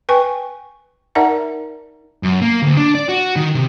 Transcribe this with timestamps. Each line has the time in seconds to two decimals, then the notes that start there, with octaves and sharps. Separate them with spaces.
0.09 B4 G5 G#5 C#6
1.15 D#4 A#4 D5 E5 F#5 A#5
2.23 F#2
2.42 A#3
2.62 D2
2.77 D4
2.95 D5
3.09 F#4
3.36 D#3
3.55 C3